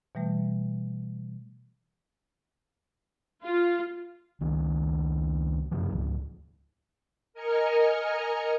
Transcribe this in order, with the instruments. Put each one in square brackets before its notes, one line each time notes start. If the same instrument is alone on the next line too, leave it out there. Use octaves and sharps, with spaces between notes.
[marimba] B2 E3 G3 A3
[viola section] F4
[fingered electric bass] C#2 D#3
F#2 C#3 F3
D1 C#2
[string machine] A#4 D#5 G#5 A#5 F6 C#7